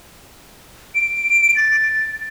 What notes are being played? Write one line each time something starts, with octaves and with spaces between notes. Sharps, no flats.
D7
A6